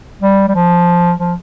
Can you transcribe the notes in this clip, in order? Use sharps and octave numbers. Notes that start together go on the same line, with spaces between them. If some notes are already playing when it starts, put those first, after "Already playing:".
G3
G3
F3
F3